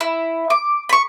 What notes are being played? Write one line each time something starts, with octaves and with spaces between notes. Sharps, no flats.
E4
D6
B5 C#6